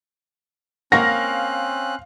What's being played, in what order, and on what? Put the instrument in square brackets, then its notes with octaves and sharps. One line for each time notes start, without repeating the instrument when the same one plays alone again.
[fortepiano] A#3 F#5 C#6 [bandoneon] C4 C#4 F#6 [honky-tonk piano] F5 [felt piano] A#6